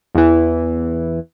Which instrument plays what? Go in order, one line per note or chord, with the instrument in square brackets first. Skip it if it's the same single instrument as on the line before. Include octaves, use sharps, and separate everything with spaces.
[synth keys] E2 E3